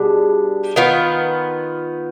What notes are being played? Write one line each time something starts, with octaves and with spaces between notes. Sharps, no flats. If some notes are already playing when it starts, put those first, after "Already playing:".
Already playing: B2 G3 D4 G#4
D#3 B3 F4